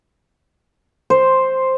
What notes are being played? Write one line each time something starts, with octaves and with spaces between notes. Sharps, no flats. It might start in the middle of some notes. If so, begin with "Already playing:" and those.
C5